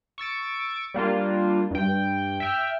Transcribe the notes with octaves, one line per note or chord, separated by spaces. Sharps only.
C#6 E6 A6 D7
G3 A#3 D4 F4
G2 G5
E5 G5 F6